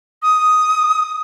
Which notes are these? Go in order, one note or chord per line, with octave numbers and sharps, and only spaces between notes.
D#6